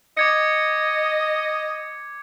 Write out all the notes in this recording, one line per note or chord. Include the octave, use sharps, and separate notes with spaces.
D#5 D6 G#6 C#7